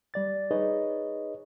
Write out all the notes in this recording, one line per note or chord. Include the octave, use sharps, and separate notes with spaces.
G3 D5 A6
D#4 G#4 B4 C#5 D#5